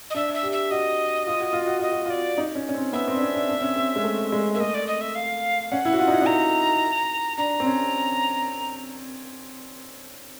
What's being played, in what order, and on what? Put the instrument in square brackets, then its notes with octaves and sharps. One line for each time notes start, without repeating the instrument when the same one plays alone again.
[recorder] D#5
[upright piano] D4 [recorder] E5
[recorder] E5
[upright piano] G4
[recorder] E5
[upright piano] F#4 [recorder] D#5
[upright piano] F4
F#4
F4
F#4
[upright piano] F4 [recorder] D#5
[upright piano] F#4
[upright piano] F4 [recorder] D5
[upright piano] D#4
C#4
C#4
C4
[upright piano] B3 [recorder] E5
[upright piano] C4
D4
C#4
D4
D4
C4
C#4
C4
G#3
A3
G#3
[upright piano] A#3 [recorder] E5
[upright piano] A3 [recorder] D#5
[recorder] D5
D#5
E5
F5
[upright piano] C#4 [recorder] F#5
[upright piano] E4
F#4
F4
D#4
E4
D#4
[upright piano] E4 [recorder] A#5
[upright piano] D4 [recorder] A#5
[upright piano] C4
C#4